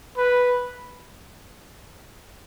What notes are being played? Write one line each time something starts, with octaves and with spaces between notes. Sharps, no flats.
B4